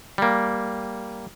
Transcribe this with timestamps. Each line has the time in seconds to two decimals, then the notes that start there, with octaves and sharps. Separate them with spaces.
0.18 G3 A#3